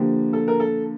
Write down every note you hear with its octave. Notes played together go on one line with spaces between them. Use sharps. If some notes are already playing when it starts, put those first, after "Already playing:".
Already playing: D3 F3 A#3 G4
A4
A#4
A4